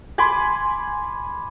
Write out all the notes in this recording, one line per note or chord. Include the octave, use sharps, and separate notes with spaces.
G#5 B5 C6 D6